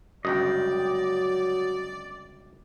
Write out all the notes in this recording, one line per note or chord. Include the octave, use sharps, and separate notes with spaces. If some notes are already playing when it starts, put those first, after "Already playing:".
G1 C#2 F#2 F#3 D5 D#5 G5